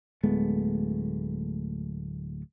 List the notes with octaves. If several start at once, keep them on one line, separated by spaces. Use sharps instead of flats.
D1 G#3 A3 B3